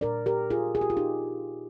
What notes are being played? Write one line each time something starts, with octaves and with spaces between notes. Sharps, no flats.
A#2 G3 D4 A#4 D5
G4 A#4
F4 G#4
G#4
G4
F4
D#4 G4